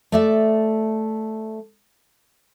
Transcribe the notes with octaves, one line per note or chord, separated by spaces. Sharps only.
A3 D5 E5